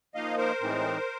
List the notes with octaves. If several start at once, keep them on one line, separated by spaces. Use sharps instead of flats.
F3 A#3 D#4 D#5 F5
A#4 C5
A2 E3 G#3 C4 D#4